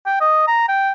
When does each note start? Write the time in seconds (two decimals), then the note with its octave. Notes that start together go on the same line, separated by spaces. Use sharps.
0.06 G5
0.20 D#5
0.47 A#5
0.68 G5